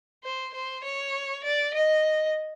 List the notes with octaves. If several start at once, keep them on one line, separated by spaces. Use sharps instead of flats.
C5
C5
C#5
D5
D#5